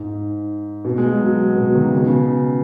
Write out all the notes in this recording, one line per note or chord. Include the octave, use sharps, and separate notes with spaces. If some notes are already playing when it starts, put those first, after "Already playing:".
Already playing: G#2
B2
G#3
F#3
F#3
B2
D#3
C#3
B2
C#3